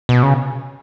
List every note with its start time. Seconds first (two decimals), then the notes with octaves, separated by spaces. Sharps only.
0.09 B2
0.23 C#3